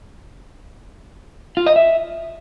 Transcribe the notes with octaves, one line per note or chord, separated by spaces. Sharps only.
F4
D#5
E5